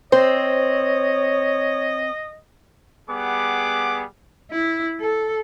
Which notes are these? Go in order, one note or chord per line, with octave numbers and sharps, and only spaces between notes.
C4 C5 C#5 D#5
G3 B3 G#4 F#5 D6
E4
A4